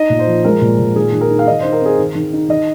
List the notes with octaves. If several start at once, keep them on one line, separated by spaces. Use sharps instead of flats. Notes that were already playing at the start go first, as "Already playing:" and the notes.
Already playing: D#4 D#5
A#2
C5
F3
G#3 A#4
A#2
A#2
D#3 G#4
D#3
A#4
D#4
F5
D#3 D#5
D#4 C5
A#4
C4 G#4
D#3
D#3
D#4
D#3 D#5